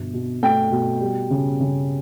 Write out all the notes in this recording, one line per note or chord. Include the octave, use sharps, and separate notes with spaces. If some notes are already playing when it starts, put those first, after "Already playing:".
Already playing: G1 B2
B2
A3 G5
B2
G3
C#3
C#3